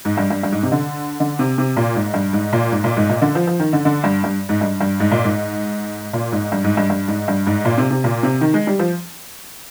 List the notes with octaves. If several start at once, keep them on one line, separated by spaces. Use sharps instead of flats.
G#2
G2
G2
G2
G#2
C3
D3
D3
C3
C3
A#2
G#2
G2
G#2
A#2
G#2
A#2
G#2
A#2
D3
F3
F3
D#3
D3
D3
G2
G2
G#2
G2
G2
G#2
A#2
G#2
A#2
G#2
G2
G#2
G2
G2
G#2
G2
G#2
A#2
C3
C3
A#2
C3
D#3
G#3
G3
F3